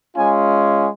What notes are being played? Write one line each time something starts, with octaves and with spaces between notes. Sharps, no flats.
G#3 C#4 F4 G#5